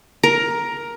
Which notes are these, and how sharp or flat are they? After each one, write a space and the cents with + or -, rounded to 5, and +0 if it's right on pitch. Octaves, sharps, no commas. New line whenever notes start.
A#4 +10